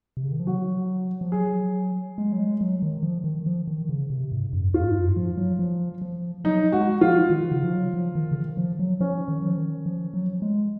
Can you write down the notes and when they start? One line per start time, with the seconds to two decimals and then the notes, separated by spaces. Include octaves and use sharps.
0.17 C3
0.24 C#3
0.32 D#3
0.40 F3
0.47 F#3 F#4
1.21 F3
1.32 F#3 G#4
2.18 G#3
2.32 F#3
2.40 G#3
2.61 F#3
2.82 D#3
3.03 F3
3.24 D#3
3.46 F3
3.67 D#3
3.89 C#3
4.10 C3
4.32 G#2
4.53 F#2
4.74 F2 F4
4.84 G#2
4.96 F#2
5.16 F3
5.38 F#3
5.59 F3
6.02 F3
6.44 F#3 D#4
6.72 G#3 F#4
7.01 F3 F4
7.30 D#3
7.51 C#3
7.64 F3
7.73 F#3
7.94 F3
8.15 D#3
8.32 C#3
8.36 D#3
8.57 F3
8.79 F#3
9.00 F3 C#4
9.28 D#3
9.42 F#3
9.49 F3
9.57 D#3
9.86 F3
10.14 F#3
10.42 G#3